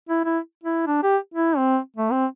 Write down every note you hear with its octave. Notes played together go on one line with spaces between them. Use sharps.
E4
E4
E4
D4
G4
E4
C4
A3
C4